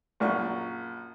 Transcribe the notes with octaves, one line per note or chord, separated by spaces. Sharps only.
A#1 F#2 C#6